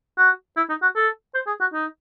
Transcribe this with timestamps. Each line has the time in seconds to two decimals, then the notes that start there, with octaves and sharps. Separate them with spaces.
0.18 F#4
0.57 E4
0.69 D#4
0.82 F#4
0.96 A4
1.35 C5
1.47 G#4
1.60 F#4
1.74 D#4